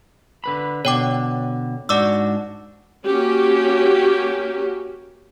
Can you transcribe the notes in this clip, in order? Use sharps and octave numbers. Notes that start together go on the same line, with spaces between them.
D3 B4 B5
B2 D3 C#5 G5 D6
G#2 D4 F#4 D5 D6 E6
A#3 C#4 F#4 G4